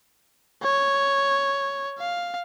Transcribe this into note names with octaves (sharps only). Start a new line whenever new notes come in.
C#5
F5